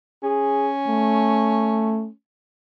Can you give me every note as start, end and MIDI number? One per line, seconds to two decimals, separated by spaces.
0.23 2.12 61
0.23 0.71 68
0.87 2.08 57